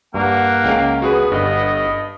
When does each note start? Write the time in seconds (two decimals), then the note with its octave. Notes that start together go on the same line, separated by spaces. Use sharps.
0.14 G2 A#3 F#5
0.64 C#2 C#4 F5 G5
1.02 B3 F#4 G#4 B4
1.32 G1 G2 D#5